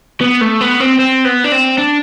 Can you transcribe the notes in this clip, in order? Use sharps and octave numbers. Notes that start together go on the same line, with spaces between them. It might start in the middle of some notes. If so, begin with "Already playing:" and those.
B3
A3
B3
C4
C4
B3
D4
C4
D4